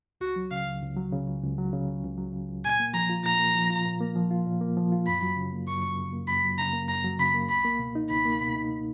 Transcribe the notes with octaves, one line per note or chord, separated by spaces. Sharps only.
C#2 F#4
F#3
C#3 F5
C#2
C#2
F#3
C#3
C#2
C#2
F#3
C#3
C#2
C#2
F#3
C#3
C#2
A#2 G#5
A#3
F3 A#5
F4
A#2 A#5
A#3
F3
F4
A#2
A#3
F3
F4
A#2
A#3
F3
F4
F#2 B5
F#3
C#3
A#3
F#2 C#6
F#3
C#3
A#3
F#2 B5
F#3
C#3 A#5
A#3
F#2 A#5
F#3
C#3 B5
A#3
C#2 B5
A#3
B2
D#4
C#2 B5
A#3
B2
D#4